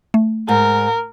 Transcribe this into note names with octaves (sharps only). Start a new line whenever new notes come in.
A3
G#2 A#4